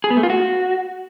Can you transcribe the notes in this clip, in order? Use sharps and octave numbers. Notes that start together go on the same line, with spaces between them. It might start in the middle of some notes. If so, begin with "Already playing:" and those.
G#4
B3
A3
F4
F#4